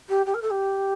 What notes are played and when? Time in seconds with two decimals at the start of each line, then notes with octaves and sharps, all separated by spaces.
0.09 G4
0.26 G4
0.34 A#4
0.42 A4
0.51 G4